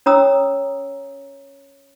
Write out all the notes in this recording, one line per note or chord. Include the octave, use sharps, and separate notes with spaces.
C#4 C#5 A#5 D#6 E6